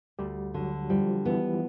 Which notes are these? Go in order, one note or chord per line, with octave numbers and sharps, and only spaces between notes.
D2 G3 G4
D3 F#3 F#4
F3 G3 F4
E3 B3 E4